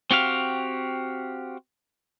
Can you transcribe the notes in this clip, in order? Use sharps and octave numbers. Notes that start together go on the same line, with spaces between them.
C4 F#4 G4 F5